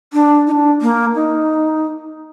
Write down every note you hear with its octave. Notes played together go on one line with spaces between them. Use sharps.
D4
D#4
D4
A#3
D#4